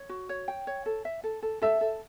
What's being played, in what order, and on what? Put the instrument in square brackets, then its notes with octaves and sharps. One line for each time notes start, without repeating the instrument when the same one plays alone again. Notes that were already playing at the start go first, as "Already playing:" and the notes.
Already playing: [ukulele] C#5
F#4
C#5
G5
C#5
A4
E5
A4
A4
[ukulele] A4 [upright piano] E5
[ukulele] A4